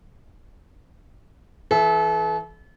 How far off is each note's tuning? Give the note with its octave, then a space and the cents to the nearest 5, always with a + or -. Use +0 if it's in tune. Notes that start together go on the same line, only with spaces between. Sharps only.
E3 +0 A4 -40 E5 +0